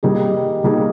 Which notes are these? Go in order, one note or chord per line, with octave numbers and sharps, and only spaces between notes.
D#3 G3 A#3 D#4 G#4
D#3 G3 A#3 D#4 G#4